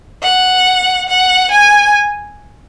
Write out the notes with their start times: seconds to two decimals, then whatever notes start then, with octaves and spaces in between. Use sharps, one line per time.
0.23 F#5
1.09 F#5
1.51 G#5